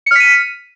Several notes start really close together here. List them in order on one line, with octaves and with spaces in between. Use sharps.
C#7 F6 B6 D#7